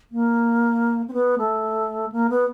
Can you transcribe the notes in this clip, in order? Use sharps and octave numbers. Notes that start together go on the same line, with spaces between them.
A#3
C4
B3
A3
A#3
B3